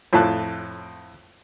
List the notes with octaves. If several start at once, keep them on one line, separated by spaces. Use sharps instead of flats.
F2 A2 F4 A5 F#6